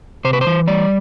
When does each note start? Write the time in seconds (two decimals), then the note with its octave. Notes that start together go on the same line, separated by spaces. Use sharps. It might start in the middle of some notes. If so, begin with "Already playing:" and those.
0.25 C3 C5
0.33 B4
0.41 C5
0.47 E3
0.67 G3 D5